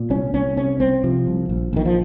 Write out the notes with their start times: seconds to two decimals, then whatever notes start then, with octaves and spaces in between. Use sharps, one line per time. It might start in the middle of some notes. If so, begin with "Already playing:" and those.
Already playing: A#2
0.10 C2 C#4
0.34 C2 C#4
0.57 C3 C#4
0.80 C2 C4
1.04 C3 F3
1.27 C2
1.49 A#1
1.73 A#1 D#3
1.85 F3